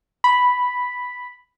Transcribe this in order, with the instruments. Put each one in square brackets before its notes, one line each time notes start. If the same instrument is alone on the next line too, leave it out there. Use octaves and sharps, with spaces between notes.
[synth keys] B5